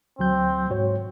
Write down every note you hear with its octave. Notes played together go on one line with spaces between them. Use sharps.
D2 F#3 C4 G6
G#2 F#4 C#5